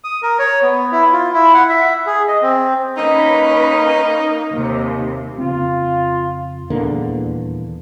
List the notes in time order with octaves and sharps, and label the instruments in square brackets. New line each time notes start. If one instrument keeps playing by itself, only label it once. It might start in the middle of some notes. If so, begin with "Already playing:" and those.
[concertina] D#6
A#4
C#5
B3
E4
F4
E4
F#5
E5
G#4
D#5
C4
[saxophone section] A#3 D#4 [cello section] C#4 B4
[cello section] D#2 C3
[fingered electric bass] F2 C#3 C4 [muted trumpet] F4
[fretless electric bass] D#1 E2 D3 A#3